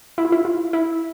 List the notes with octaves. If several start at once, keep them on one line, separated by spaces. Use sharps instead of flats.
E4
F4
E4
F4
E4